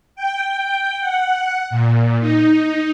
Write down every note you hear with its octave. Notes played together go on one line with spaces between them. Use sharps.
G5
F#5
A#2
D#4